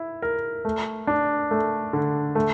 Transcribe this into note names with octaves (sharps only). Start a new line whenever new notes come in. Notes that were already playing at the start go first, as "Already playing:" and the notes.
Already playing: E4
A#4
A3
D4
A3
D3
A3